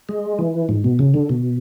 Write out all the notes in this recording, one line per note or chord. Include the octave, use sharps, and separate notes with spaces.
G#3
E3
G#2
B2
C#3
D3
B2